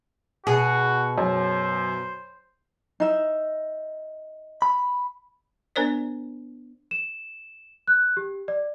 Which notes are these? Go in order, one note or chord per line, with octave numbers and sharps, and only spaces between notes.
B2 F#4 G#4
F#2 C5
D#4 E5
B5
B3 D4 A#4 C5 D5
E7
F#6
G4
D5